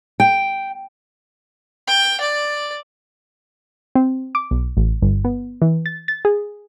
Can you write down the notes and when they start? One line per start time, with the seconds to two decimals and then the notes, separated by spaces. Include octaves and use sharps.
0.20 G5
1.88 G5
2.21 D5
3.95 C4
4.35 D6
4.51 B1
4.77 A1
5.02 G1
5.25 B3
5.62 E3
5.86 A6
6.08 A6
6.25 G#4